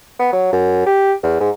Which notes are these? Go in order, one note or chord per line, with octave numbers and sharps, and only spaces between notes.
B3
F#3
F#2
G4
E2
G#2